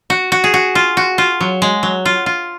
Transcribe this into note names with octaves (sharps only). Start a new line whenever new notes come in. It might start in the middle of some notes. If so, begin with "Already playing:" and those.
F#4
F#4
G#4
F#4
F4
F#4
F4
F#3
G#3
F#3
F4
F4